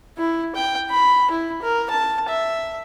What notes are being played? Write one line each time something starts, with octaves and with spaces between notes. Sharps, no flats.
E4
G5
B5
E4
A#4
A5
E5